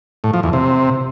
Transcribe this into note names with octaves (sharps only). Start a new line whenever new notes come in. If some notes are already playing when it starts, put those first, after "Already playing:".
A2
F3
E2
C3